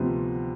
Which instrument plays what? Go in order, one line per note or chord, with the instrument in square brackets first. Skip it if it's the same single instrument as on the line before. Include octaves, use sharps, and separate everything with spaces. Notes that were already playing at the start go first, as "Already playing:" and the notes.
Already playing: [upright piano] D2 C3 F3 B3